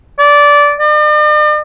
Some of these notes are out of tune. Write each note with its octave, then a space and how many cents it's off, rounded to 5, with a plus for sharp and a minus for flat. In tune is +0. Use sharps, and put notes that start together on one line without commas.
D5 -15
D5 +45